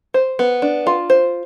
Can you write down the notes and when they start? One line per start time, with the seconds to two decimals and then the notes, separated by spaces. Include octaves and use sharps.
0.14 C5
0.39 B3
0.62 D4
0.87 F4
1.10 C5